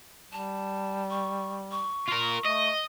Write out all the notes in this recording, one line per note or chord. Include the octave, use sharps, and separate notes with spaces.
G3 A5
C#6
C#6
F4 A#4
A3 D#5